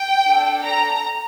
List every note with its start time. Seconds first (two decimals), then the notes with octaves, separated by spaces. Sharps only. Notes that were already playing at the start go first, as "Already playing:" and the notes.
Already playing: G5
0.28 D4 A4
0.63 A#5